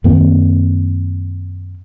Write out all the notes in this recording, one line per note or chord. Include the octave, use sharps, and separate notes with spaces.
F#2 D#3 A#3 C4